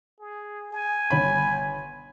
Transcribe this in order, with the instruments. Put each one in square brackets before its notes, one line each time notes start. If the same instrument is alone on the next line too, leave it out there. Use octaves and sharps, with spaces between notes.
[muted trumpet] G#4
G#5
[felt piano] G1 C#5 B5